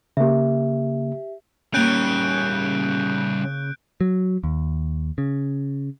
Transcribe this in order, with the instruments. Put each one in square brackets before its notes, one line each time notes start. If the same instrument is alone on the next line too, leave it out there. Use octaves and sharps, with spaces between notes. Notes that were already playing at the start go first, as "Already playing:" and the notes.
[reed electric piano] C#3 A#3 [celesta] G4 E5
[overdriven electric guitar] C#3 [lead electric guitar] G3 C#4 [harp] A#3 G5 [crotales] F#6 G6 D7
[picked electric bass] F#3
D#2
C#3